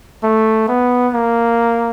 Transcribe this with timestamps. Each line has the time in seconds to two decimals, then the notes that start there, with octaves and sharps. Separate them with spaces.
0.24 A3
0.68 B3
1.14 A#3